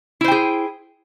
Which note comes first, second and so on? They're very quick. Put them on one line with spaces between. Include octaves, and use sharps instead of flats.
E4 C5 G5 G#4